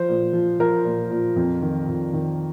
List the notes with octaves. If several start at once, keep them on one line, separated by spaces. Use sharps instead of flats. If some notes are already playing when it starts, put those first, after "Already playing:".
Already playing: F3 C5
A#2
F3
F3 A#4
A#2
A#2
F2
D#3
F2
D#3